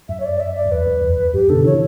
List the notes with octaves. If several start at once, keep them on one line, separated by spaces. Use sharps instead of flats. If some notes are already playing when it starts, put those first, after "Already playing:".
F#2 E5
C#5
D5
E5
D5
E2 B4
F#2
E2
F#2 G4
B2 D3 A4
C#3 E3 C#5